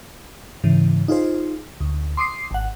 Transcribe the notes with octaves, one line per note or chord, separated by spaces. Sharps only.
G#2 C#3 E3
D#4 F4 G#4 C5
D2
C6 D6 D#6 C7
G#1 F#5